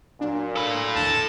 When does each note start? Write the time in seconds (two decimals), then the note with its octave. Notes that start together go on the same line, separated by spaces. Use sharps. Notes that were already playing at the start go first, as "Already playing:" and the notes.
0.21 A#2 F#3 D4
0.56 A4 B5
0.96 D#2 D3 E3 A5